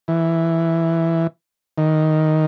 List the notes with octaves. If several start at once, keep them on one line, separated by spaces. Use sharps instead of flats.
E3
D#3